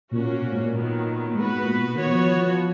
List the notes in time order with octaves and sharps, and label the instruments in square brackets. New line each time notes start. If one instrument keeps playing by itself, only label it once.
[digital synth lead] A#2 [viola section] A#3 C#4 F#4
[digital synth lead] A#2
G#2
A#2
[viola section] D#3 F#3 B3
[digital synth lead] G#2 [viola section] B3 F#4 B4
[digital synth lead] G#2
G#2
A#2
B2
[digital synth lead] D#3 [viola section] B3 F#4 C#5
[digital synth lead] F3
F3
F3
F3